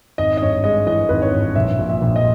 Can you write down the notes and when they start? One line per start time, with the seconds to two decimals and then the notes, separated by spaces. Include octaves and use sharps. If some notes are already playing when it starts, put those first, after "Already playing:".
0.18 G#1 D#5
0.37 D#5
0.42 G2 C#5
0.64 G#3 D#5
0.87 E3 D#5
1.09 G#1 B4
1.22 C#5
1.32 G2
1.56 A#1 E5
1.79 A#2
1.89 E5
2.02 A#1
2.16 D#5